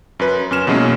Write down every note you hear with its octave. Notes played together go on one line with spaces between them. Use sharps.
F#2 B4
F#2 C#4 F6 E7
B2 E3 F#3 G#3 A#3 C#4